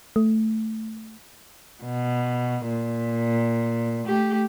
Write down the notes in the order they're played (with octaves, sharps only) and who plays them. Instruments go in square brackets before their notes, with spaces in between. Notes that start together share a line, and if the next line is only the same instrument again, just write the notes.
[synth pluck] A3
[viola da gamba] B2
A#2
A3 G4